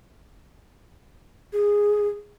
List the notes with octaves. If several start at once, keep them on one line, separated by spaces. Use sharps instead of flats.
G#4